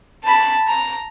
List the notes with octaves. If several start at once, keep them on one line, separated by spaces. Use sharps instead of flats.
A5 B5
A#5